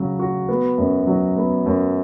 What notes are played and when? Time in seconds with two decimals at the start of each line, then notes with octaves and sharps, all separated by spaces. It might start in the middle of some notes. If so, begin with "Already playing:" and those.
Already playing: C#3 F#3 F#4
0.19 F#4
0.49 B3
0.78 F#2
1.07 F#3
1.37 B3
1.66 F#2